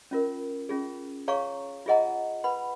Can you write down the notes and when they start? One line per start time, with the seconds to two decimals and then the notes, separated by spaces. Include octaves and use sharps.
0.11 C#4 F4 A#4
0.69 C#4 F4 G#4
1.28 G#4 C#5 F5 A#5 C#6
1.86 F4 G#4 D#5 F#5 A#5
2.44 B4 F#5 B5